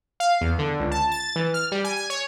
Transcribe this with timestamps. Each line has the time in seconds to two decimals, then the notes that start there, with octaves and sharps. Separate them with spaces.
0.20 F5
0.41 E2
0.59 D3
0.80 C#2
0.91 A5
1.11 A6
1.36 E3
1.54 F6
1.72 G3
1.84 G#5
1.96 G#5
2.10 C#5